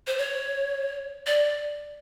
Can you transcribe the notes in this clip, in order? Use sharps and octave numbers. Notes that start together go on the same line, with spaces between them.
C5
C#5
D5